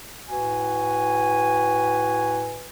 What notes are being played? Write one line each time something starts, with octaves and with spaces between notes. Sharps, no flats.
A2 F#4 B4 G#5